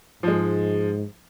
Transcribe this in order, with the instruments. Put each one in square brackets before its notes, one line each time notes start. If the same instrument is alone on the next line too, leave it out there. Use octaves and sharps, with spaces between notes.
[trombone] G#2 [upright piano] F3 G#3